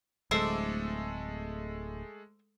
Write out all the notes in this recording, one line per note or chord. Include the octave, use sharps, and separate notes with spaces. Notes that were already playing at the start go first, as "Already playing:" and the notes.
D1 G#3 A3 A4 C5 E5 D6